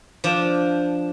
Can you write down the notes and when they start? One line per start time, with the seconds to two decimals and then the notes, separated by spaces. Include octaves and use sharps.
0.24 F3 D4